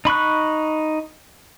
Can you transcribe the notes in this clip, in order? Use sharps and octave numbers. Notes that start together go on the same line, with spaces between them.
D#4 B5 C#6 F#6